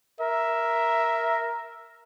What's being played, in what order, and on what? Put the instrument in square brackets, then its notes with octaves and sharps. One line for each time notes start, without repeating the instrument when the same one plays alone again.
[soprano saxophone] A#4 [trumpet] E5